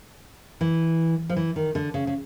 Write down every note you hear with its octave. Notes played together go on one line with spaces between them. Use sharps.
E3
F3
E3
D#3
D3
C#3
C#3